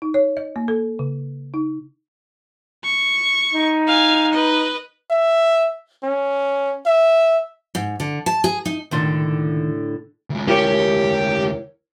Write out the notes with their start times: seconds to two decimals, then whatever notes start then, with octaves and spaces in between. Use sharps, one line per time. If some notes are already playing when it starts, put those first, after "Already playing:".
0.02 D#4
0.14 C#5
0.37 D#5
0.56 A#3
0.68 A4
0.99 C#3
1.54 D#4
2.84 C#6
3.53 D#4
3.87 F5 G#5
4.33 B4 D#5
5.10 E5
6.03 C#4
6.86 E5
7.75 G#2
8.00 D3
8.26 A5
8.44 G#4
8.66 D#4
8.91 C#2 A2 D3 D#3 D4 C6
10.30 D2 G#3
10.48 E4 G4 A#4 C#5